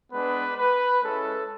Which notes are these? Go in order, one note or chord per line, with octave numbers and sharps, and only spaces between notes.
G#3 B3 D4 B4
B4
G#3 C#4 E4 A4